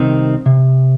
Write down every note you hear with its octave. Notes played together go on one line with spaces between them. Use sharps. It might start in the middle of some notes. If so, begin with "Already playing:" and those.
Already playing: C2 C3 D#3 C4 D#4
C3